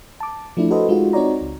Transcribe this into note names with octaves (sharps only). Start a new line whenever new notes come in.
A5 D6
F3 A3 D4 E4
F#4 A4 B4 C5 D#5
G#3 D#4 F4 F#4
C4 D#4 F#4 C#5 D5 A#5
C#2